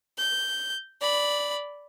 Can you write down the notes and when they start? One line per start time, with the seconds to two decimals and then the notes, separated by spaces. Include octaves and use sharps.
0.18 G6
1.01 D5 B5